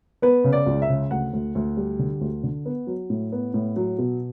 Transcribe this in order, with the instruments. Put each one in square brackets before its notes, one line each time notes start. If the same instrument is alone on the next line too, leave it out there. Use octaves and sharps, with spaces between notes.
[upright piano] B3 B4
C#3
D5
C#2
E5
C#3
D2 F#5
D2
D2
G3
D3
D2
D3
B3
F#3
A2
B3
A2
F#3
B2